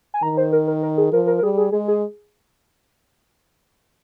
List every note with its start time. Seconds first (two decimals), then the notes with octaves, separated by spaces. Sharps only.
0.14 G#5
0.23 D#3 A#5
0.37 C5
0.52 A#4
0.67 A#4
0.83 A#4
0.98 G#4
1.13 F3 A#4
1.27 A#4
1.38 A#4
1.43 G3 G#4
1.57 G#4
1.72 G#3 G#4
1.88 G#4